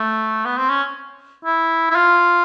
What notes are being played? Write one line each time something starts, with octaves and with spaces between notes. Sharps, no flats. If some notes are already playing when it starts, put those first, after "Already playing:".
Already playing: A3
B3
C4
C#4
E4
E4
F4